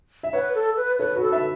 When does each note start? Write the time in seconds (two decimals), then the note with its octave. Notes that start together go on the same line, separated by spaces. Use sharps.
0.23 E5
0.33 B4 C#5 F#5
0.55 A4
0.77 B4
0.99 A4 B4 C#5
1.16 F#4 B4
1.21 A4
1.32 B4 E5